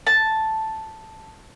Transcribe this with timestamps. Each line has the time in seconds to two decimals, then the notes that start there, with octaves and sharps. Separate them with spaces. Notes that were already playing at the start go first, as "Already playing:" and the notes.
0.07 A5